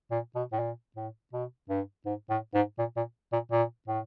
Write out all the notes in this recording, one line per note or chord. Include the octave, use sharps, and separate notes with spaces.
A#2
B2
A2
A#2
A2
B2
G2
G#2
A2
G#2
A#2
A#2
A#2
A#2
A2